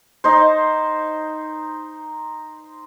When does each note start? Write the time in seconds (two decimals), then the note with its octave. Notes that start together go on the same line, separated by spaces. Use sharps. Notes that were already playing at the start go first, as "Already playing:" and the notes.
0.24 D#4 C5